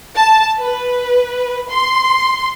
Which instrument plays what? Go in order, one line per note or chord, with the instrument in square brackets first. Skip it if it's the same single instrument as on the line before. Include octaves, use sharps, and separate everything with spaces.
[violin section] A5
B4
C6